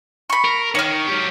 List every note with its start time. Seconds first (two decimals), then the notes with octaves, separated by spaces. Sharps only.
0.30 B5 C#6
0.45 A#4
0.75 D#3 C#5 F6
1.07 F#3 G4